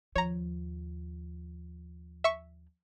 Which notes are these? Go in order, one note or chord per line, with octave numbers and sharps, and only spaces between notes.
D#2 F3 C#5 A#5
E5 C#6